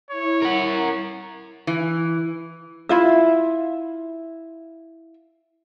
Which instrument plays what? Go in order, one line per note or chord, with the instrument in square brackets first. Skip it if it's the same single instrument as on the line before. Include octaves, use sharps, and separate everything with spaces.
[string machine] E4 [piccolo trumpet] C#5
[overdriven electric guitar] A#4 F#5
[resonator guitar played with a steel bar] E3
[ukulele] E4 F4 E5